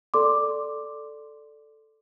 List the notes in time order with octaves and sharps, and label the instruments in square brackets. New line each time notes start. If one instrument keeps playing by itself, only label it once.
[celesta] A4 D5 C6 D6